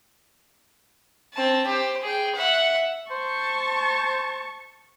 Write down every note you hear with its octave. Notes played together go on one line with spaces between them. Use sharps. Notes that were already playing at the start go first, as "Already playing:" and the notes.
C4 A5
G4 C5
G#4 G5
E5 F#5
C5 A5 C#6